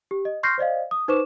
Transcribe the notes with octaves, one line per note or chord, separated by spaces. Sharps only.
G4
D#5
C6 C#6 F6 G6 A#6 C7
C5 D5 D#5 F5
D#6
D#4 B4 C5 C#6 D6 E7